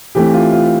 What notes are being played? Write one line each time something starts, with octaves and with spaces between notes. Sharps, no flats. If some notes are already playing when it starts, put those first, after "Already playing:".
E3 A3 C4 G4
F4
F4